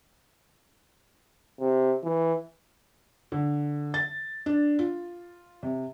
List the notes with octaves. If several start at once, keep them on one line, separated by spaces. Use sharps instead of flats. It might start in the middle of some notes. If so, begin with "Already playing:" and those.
C3
E3
D3
A6
D4
F4
C3